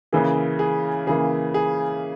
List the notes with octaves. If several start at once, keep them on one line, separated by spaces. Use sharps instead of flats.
C#3 E3 A#3 G#4
G#4
C#3 E3 A#3 G#4
G#4